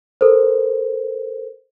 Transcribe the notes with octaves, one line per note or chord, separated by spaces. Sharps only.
A4 A#4 C5